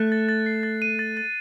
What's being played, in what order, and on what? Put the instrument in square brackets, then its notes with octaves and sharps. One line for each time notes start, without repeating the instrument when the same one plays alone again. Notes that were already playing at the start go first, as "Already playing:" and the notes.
Already playing: [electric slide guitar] A3 [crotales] F#6
[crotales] A6
A6
C7
A6
D#7
A6
A6